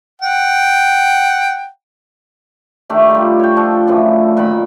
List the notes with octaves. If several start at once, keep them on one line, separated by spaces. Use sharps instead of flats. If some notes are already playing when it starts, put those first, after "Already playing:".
F#5 G5
D#3 A3 D4 G4
G3 F4
C#5 G5
F3 D4 A4 C#6
F#2 A2 E3 F3
A#2 D#3 A5 B5